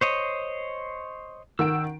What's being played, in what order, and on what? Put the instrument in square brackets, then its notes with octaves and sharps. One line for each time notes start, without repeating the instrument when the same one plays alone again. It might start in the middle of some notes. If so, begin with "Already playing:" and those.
[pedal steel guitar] C5 C#5 D#5
[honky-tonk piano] D#3 F#5 D7 [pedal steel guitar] E6